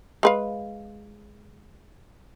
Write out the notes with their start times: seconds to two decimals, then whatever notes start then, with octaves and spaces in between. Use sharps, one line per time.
0.23 G#3 B4 F5